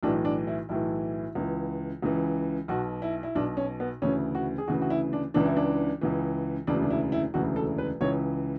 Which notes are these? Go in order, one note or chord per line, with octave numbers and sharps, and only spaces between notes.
B1 A2 E3 D4
D4
E4
B1 A2 E3 E4
C#2 C#3 E3
C#2 C#3 E3
B1 B2 F#4
E4
E4
B1 B2 D4
C#4
B3
D2 C#3 E3 C#4
F#4
G#4
D2 C#3 E3 F#4
F#4
E4
D4
C#2 C#3 E3 D4
E4
D4
C#2 C#3 E3
E1 D2 C#3 E3 D4
D4
E4
E4
E1 D2 C#3 E3 F#4
A4
B4
C#2 C#3 E3 C#5